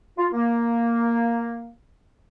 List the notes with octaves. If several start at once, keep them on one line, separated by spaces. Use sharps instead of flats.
F4
A#3